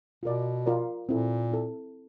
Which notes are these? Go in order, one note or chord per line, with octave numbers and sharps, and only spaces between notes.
B2 F4 A#4 D5
F4 A#4 D5
A#2 C4 E4 A4
C4 E4 A4